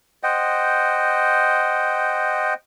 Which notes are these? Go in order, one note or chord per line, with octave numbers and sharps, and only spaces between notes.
C5 D#5 F#5 G5